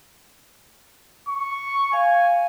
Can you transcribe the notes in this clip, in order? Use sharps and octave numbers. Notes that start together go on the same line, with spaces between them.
C#6
F5 G#5